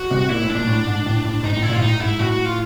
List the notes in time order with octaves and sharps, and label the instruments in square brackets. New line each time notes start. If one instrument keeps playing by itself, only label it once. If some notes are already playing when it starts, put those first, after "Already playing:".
Already playing: [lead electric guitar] F#4
[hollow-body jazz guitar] C2 C3
[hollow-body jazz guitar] A#2 [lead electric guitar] E4
[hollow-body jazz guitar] A2
[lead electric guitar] D4
[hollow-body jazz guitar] A#2
A2
G#2
A2
A2
[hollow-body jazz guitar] G#2 [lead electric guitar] D#4
[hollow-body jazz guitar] A2 [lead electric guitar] D#4
[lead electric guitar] E4
[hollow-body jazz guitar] A#2
[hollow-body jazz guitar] G#2 [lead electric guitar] F4
[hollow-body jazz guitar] A2 [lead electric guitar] D#4
[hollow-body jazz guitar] G#2 [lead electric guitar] E4
[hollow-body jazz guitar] A2 [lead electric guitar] F#4
[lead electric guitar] F#4
F4